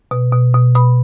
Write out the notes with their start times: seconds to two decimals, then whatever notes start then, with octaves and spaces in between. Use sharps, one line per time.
0.11 B2
0.32 B2
0.54 B2
0.75 B2 B5